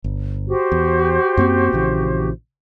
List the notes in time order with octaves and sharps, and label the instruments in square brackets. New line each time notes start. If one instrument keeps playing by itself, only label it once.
[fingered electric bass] G1
[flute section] F#4 G4 C5
[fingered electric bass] E2
F#2 A#3 C4
A#1 C#3 E3